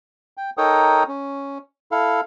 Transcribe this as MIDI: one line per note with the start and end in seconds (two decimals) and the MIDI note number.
0.37 0.50 79
0.57 1.03 63
0.57 1.03 69
0.57 1.03 70
0.57 1.03 73
0.57 1.03 79
0.57 1.03 87
1.08 1.58 61
1.92 2.21 64
1.92 2.21 69
1.92 2.21 77